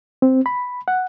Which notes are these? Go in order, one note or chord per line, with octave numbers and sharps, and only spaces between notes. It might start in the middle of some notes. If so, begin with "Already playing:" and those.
C4
B5
F#5